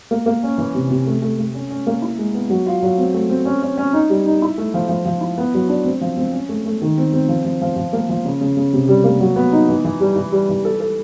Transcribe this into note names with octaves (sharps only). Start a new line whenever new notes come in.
A#3
A#3
C#4
E3
C3
C3
A3
A3
A3
C#4
C#4
A#3
E4
G#3
B3
F#3
F4
F#3
C4
A3
C4
C#4
C#4
C#4
D#4
G3
D#4
E4
A3
F3
F3
F3
E4
B3
F#3
D4
C4
F3
C4
C#4
A3
A3
D#3
C4
C4
F3
F3
F3
F3
A#3
F3
C#3
C#3
C#3
C3
G3
A#3
F#3
B3
D#4
E3
E3
G3
E3
G3
E3
A4
A4